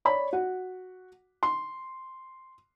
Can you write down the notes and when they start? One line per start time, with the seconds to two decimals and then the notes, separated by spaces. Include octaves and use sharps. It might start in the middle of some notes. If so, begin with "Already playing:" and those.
0.05 C#5 D5 B5
0.33 F#4 F#5
1.43 C6